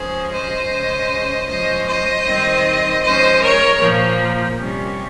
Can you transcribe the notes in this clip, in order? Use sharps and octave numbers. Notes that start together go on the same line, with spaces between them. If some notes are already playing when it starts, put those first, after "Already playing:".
Already playing: F3 G#3 C#4 G#4 C5
C5 D#5
C#3 G#3 C#4
F3 G#3 C#4 C5 D#5
C5 D#5
D#3 G3 C4
F3 G#3 C#4 C5 D#5
A#4 C#5
A#2 F3 A#3
C3 G3 C#4